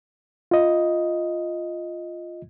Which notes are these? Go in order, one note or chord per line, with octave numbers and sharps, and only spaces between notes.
F4 D#5